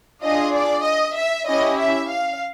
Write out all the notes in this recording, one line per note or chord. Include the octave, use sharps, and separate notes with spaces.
D4 F4 G#4 D#5
D5
D#5
E5
C#4 E4 G4 D#5
E5
F5